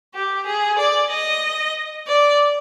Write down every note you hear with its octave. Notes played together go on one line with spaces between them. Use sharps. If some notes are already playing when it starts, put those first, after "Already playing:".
G4
G#4
D5
D#5
D5